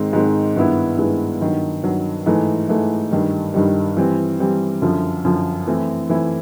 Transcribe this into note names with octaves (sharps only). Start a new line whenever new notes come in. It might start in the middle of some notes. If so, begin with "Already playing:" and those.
Already playing: G#2 D#3 G#3 C4
G#2 D#3 G#3 C4
G2 D#3 G#3 B3 E4
G2 D#3 G#3 B3 E4
G2 D#3 F#3
G2 D#3 F#3
G#2 E3 A3
G#2 E3 A3
G2 D#3 G3
G2 D#3 G3
E3 G3 C4
E3 G3 C4
F#2 D3 F3
F#2 D3 F3
E3 A3 C4 E4
E3 A3 C4 E4